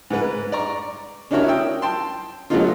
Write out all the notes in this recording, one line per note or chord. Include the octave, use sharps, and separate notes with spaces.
G#2 G#3 B4
D5 A#5 C#6
C#4 D4 E4 F#4 A#4 C#5
G5 D#6 E6
G5 A5 C6
F#3 A3 B3 C#4 D#4 F4